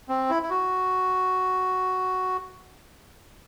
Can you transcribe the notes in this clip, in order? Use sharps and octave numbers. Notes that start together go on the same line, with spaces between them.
C4
E4
E4
F#4